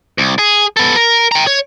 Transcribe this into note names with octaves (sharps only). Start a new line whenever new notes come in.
C2
G#4
B3 A4
A#4
G5 A#5
C#5